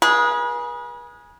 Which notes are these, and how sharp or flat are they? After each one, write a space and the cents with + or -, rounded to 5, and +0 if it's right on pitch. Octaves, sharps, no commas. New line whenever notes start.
G#4 +0 B4 -40